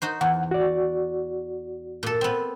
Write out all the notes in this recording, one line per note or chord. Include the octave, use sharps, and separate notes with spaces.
D#4 F#4 C5
E2 F#5
F#4 D5
A#2 A4
B3 C4